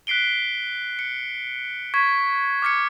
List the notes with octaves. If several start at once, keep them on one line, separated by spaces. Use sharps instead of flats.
F#6 B6 C7 D7 G7
C#7
C#6 G#6 B6
D6 F6 G#6 C#7